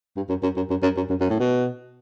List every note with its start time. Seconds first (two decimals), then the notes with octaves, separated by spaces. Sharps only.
0.16 G2
0.29 F#2
0.43 F#2
0.57 F#2
0.70 F#2
0.83 F#2
0.97 F#2
1.10 F#2
1.21 F#2
1.30 A2
1.40 B2